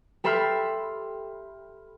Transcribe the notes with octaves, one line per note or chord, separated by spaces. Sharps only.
G4 A4 E5 B5 C6 F6